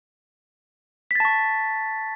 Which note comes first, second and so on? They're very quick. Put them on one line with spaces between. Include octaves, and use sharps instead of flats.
B6 A6 A5 C#6